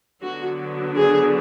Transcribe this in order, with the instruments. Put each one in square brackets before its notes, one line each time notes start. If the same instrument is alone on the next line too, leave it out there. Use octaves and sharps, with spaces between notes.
[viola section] D3 F#3 B3 D4 F#4
G#4